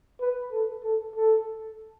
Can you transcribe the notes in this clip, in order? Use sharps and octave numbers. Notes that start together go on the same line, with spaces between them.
B4
A4
A4
A4